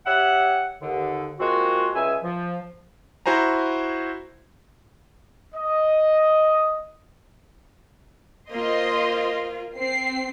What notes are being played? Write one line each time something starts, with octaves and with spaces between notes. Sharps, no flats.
G4 C#5 E5 F#5
D#2 D3
G#3 A#3 C4 F4 F#4
C#2 E5 G#5
F3
E4 F#4 C5 G#5 A#5
D#5
A#3 F4 C5 D#5 C6
C4 C7